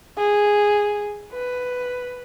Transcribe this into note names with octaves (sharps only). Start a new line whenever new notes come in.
G#4
B4